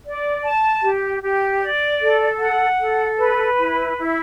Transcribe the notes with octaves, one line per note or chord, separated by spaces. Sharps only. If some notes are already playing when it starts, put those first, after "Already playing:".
D5
A5
G4
G4
D5
A4
F#5
A4
B4
E4
E4